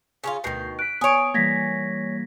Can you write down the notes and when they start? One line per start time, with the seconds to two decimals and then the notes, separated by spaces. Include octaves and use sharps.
0.24 C#3 C#4 F4
0.44 D2 B2 D#3 G6 C7
0.79 F#6 B6 D7
1.01 B3 C#5 G#5 D#6 D7
1.34 E3 G3 A#3 G#6 A#6 B6